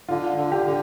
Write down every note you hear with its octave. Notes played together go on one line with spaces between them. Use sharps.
D3 F4
D3
G4
D3